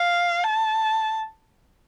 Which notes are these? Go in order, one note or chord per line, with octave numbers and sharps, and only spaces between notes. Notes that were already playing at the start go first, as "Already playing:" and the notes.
Already playing: F5
A5